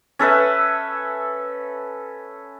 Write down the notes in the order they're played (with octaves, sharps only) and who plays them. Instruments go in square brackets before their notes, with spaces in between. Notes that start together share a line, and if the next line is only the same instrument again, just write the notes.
[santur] C#4 A4 B4 E5